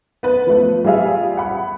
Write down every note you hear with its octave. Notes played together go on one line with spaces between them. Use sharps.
B3 B4
F3 A3
G3 F4 G#4 E5 F5
F#5 B5